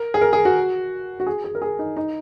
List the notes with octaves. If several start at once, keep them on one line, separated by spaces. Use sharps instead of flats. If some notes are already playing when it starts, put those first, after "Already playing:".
Already playing: A#4
G#4
A#4
G#4
F#4
F#4
G#4
G#4
A#4
G#4
D#4
D#4